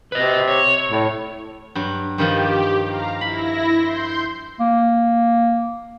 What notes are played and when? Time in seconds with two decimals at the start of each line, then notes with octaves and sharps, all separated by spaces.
0.12 C3 B4 D#5
0.48 C#5
0.90 A2
1.75 G2 F#3
2.18 G2 D#3 F3 G4
2.87 F5 A#5
3.21 E4 B5 A#6
3.78 C6 G6
4.60 A#3